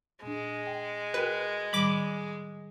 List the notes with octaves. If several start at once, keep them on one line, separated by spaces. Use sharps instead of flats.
A#2 G#3 D4
G5
F#4 A#4 B4 G5
A2 D#3 G3 B5 D6